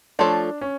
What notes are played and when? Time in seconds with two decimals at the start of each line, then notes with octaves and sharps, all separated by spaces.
0.19 F3 A3 D4 F4 A4 C#5
0.61 C#4